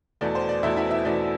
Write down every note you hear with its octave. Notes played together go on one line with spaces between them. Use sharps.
E2 B2 A3 D5
C5
D5
E2 B2 A3 E4 E5
E4 E5
E4 E5
E2 B2 A3 D5